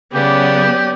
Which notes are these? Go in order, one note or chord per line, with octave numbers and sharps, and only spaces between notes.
C#3 F#3 B3 C#4 G4 D5